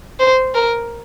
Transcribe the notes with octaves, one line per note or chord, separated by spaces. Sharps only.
C5
A#4